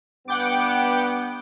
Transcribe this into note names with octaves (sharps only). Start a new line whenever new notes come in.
G2 B3 F#5 G5 D6